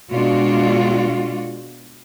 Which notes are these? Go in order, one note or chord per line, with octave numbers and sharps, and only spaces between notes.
B2 G#3 D4 F4 F#4